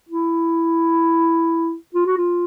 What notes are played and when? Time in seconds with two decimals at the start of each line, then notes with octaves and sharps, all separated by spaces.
0.09 E4
1.95 F4
2.06 F#4
2.18 F4